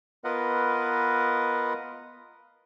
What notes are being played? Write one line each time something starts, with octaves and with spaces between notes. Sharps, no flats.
B3 F4 A#4 B4 D#5 F#5